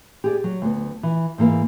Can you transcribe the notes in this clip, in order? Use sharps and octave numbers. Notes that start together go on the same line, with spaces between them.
G4 G#4 D5
F#3
D2 B3
E3
G#2 E3 A#3 B4